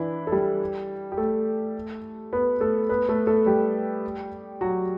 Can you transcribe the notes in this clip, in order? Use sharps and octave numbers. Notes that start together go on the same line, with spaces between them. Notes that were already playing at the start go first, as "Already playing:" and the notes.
Already playing: E3 D4 E4
A4
G3 G4
G4
A3 A4
B3 B4
A3 A4
B3 B4
A3 A4
A3 A4
G3 G4
F#3 F#4